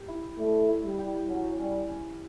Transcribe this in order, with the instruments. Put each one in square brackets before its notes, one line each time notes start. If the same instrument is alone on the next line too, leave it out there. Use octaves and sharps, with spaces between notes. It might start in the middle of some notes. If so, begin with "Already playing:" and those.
Already playing: [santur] G4
E4
[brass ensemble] A3 [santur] D5
[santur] E4
[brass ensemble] G3
[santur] G4
[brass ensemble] F#3 [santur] C#4
[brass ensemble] G3 [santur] C#4
[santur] C#4